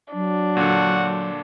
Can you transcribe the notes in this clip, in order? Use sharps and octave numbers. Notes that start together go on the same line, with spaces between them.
F#3 D4
A#2 D3 F#4